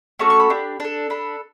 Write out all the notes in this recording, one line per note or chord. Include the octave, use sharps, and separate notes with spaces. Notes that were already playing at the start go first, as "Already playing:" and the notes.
A3 C#4 F#4 A4 C#6
C#6
B5
D4 G4
D4 A4
D4 A4 B5